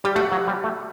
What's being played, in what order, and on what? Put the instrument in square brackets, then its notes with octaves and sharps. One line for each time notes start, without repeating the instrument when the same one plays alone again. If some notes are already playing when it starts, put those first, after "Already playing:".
[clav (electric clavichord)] G3 [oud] G4
[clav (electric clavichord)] A3 [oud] F#4
[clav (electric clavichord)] F#3
G3
A3